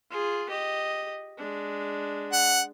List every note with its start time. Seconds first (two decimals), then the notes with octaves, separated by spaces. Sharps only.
0.10 F4 G#4
0.50 G4 D#5
1.38 G#3 D4
2.32 F#5